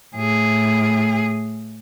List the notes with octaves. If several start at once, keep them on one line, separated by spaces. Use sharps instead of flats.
A2 G#4